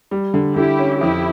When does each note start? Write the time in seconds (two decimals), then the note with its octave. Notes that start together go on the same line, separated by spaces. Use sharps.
0.11 G3
0.34 D3
0.56 D3 E4 G4
0.79 C#4
1.00 F2 E4 G4